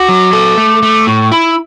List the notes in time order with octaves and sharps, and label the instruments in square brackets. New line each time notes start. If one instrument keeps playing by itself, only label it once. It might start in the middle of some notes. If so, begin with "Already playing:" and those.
Already playing: [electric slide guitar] F#4 [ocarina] D6
[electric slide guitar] F#3
A4
A3
A3
[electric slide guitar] A2 [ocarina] C#6
[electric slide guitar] E4 [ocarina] B5